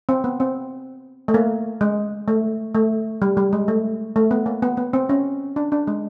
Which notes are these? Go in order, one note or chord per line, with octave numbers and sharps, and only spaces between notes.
C4
B3
C4
A3
A#3
G#3
A3
A3
G3
G3
G#3
A3
A3
B3
A#3
B3
B3
C4
C#4
D4
D4
G#3